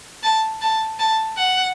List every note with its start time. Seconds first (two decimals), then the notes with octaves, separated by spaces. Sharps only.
0.23 A5
0.62 A5
0.99 A5
1.38 F#5